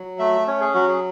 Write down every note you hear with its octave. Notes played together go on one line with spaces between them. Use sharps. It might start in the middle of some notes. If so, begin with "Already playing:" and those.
Already playing: F#3
A3 E5
C#4 C#5
G#4
F#3 F#4
G#4